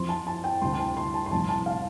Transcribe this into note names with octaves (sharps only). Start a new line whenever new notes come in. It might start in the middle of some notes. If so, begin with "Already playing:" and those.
Already playing: F2 F3 C6
A5
A5
G5
D2 C3 G3 C6
G5
A5
C6
A5
C6
F1 F2 C3 G3 A5
A5
F5